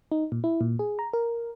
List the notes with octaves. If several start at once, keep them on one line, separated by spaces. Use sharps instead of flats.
D#4
A#2
E4
A#2
G#4
A#5
A#4